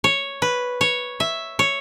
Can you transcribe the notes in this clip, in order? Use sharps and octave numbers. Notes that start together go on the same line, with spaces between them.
C#5
B4
C#5
E5
C#5